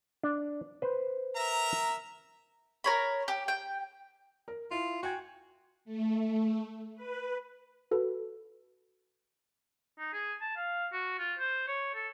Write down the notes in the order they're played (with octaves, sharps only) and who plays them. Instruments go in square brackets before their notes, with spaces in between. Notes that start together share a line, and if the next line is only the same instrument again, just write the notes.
[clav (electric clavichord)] D4
B4 C5
[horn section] A#4 E5 A#5
[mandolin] A#4 C#5 B5
G4
G5
[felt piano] A#4
[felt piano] E4 [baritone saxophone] F4
[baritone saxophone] F#4 [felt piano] G5 G#5 G#6
[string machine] A3
B4
[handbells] F#4 A4 B4
[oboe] D#4
G#4
A5
F5
F#4
F4
C5
C#5
A4